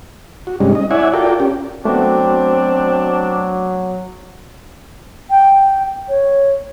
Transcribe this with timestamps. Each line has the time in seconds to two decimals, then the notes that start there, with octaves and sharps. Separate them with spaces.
0.47 F#4
0.60 G2 C3 G3 G#3 C#4 D#4
0.75 D#5
0.91 E4 C#5 D5 E5 F#5 G#5
1.14 F4 F#4 A4 A#4 D5 G5
1.40 C#4 G4
1.85 F#3 A3 B3 C4 D4 F#4
5.30 G5
6.09 C#5